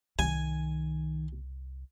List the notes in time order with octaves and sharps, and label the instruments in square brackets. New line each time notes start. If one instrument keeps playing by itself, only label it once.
[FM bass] C2 [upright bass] D#3 [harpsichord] G#5